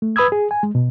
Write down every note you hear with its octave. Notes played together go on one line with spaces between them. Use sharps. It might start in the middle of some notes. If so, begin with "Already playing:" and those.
A3
B4 B5 D#6 E6 G#6
G#4
G#5
G#3
B2